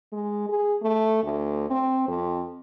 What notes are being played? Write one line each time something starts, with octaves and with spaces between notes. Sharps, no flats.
G#3
G#4
A3
D2
C4
F2